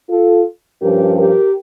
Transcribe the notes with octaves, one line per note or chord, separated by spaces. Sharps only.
F4 A4
G2 F3 C#4 G4 A#4
G4 A#4